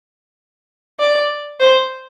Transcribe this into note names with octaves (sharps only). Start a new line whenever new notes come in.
D5
C5